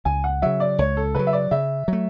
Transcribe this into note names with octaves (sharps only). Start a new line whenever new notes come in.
C#2 G#5
F#5
C#3 F#3 E5
D5
C#2 C#5
A4
C#3 F#3 B4
E5
D5
C#3 E5
F#3 A3